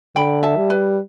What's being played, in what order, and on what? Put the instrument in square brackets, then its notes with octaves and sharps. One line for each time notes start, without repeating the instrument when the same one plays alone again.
[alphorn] D3 [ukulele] G5 B5
[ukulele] E5 A5
[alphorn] G3
[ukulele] B4